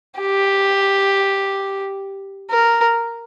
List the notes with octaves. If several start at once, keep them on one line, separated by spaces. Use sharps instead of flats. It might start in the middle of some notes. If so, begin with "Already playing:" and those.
G4
A#4